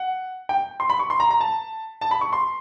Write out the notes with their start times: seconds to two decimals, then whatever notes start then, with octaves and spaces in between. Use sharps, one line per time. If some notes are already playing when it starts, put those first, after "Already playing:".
Already playing: F#5
0.49 G5
0.80 C6
0.90 B5
0.99 C#6
1.10 C6
1.20 A#5
1.31 A#5
1.41 A5
2.01 A5
2.11 B5
2.21 C#6
2.33 C6